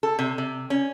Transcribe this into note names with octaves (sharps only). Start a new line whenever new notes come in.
A4
C3
C3
C#4